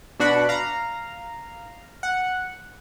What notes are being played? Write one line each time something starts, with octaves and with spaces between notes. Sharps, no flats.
B2 D4 F#4 F#5 B5
F5 A#5
F#5